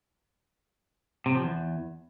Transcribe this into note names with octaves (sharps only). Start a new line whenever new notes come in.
C3
F3
E2